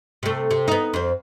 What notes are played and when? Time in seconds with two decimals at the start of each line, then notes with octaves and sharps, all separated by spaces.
0.23 C3 A3
0.51 C3
0.68 B3 D#4
0.94 F2 C4